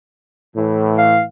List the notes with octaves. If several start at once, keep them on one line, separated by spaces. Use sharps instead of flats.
A2 E3
F5